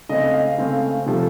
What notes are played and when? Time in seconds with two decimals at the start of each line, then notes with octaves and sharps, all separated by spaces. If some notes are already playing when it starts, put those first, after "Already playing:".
0.09 C#3 A3 C4 D#5
0.33 F5
0.58 C#3 A3 C4
1.06 C3 F3 A3